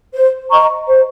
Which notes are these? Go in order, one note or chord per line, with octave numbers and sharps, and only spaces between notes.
C5
D#5 A#5 C#6
C5